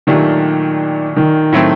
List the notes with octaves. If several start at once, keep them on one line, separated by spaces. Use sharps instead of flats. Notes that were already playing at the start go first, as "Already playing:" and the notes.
A#2 D#3 F#3 A3 D4 G4
D#3
A2 F#3 A3 C4